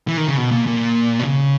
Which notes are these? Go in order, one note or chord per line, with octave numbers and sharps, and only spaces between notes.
E3
D#3
C#3
B2
A#2
A#2
B2
C#3